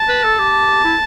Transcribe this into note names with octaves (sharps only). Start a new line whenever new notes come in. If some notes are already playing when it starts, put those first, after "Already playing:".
Already playing: A5
B4
A4
G4
E4